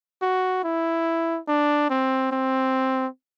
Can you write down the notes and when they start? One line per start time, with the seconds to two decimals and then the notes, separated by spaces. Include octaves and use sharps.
0.22 F#4
0.64 E4
1.48 D4
1.90 C4
2.32 C4